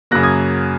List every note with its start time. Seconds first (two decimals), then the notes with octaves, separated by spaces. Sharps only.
0.11 F#2 C#3 F#3 A#3 F#6 A#6
0.23 D#6 G#6